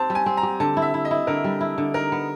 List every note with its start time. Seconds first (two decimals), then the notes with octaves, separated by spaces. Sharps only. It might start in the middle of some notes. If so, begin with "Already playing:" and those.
Already playing: C4 G4 A5
0.10 G3
0.15 G#5
0.26 C4
0.37 A#5
0.43 G4
0.60 D3 A5
0.77 E4
0.82 E5
0.94 E4
1.05 D#5
1.11 E4
1.27 D3 A#4
1.44 G3
1.61 E4
1.78 D3
1.94 D#4 A#4
2.12 B3